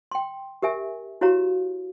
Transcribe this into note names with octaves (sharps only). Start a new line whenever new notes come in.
G5 C6
G4 A#4 E5 G#5
E4 F#4 G4 C#5 F5 A#5